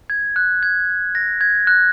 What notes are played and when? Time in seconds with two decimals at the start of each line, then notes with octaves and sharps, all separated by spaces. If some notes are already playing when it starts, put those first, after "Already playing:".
0.10 G#6
0.36 F#6
0.63 G#6
1.15 A#6
1.41 G#6
1.67 F#6